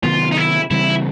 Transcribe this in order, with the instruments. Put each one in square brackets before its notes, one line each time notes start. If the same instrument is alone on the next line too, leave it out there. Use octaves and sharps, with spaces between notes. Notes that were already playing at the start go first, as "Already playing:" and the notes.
[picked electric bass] C3 D#3 F#3 B3 [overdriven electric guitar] F4
[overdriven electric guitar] D#4
E4
[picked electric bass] C#3 E3 G3 C4 [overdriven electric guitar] E4